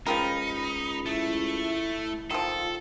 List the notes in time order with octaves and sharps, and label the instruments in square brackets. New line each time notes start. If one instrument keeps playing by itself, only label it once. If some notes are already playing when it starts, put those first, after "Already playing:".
[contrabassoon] C#2 [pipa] F3 G4 A#4 [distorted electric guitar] D#4 [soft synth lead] B5
[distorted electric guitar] A3 [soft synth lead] E4
[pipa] D#3 F3 [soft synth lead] F4 [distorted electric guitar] A4